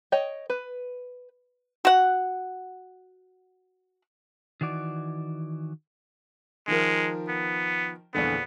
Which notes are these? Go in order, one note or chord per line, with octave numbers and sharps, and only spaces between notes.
C#5 D#5 G5
B4
F#4 F#5
D#3 E3 F#4 D5
D#3 F3 G#3 A#4
B3
A#1 E2 D3 B3